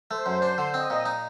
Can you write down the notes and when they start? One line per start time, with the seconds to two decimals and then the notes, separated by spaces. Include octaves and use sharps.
0.10 A3 C5
0.26 F#2
0.42 D4
0.58 D3
0.73 C4 D#5
0.90 A#2
1.06 D#4